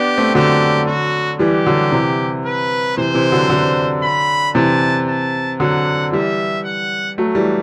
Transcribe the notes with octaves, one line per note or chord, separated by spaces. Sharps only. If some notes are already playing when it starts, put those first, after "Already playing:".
Already playing: B3 D4 G4
A3 C4
D3 F#3 G4
F#4
E3 G3 G4
D3 F#3
C3 E3
B4
C3 E3 C5
C3 E3
D3 F#3
D3 F#3
B5
C3 E3 A5
A5
D3 F#3 F#5
E3 G3 E5
F#5
F#3 A3
E3 G3